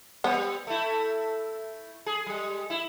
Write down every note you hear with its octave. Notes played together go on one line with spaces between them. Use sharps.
G3 B3 C4
A3 E4
G#4
G3 G#3
E4